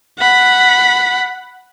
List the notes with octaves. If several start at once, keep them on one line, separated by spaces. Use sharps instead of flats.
F#5 B5